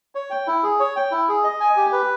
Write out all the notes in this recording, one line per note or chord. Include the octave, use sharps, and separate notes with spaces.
C#5
G5
E4
G#4
C#5
G5
E4
G#4
D#5
G#5
G4
B4